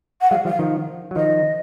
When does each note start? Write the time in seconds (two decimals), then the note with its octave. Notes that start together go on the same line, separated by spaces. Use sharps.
0.21 F#5
0.31 F#3 G#3 F5
0.45 F3 G3 F5
0.59 D#3 F3
1.11 F#3
1.16 D#3 F3 D#5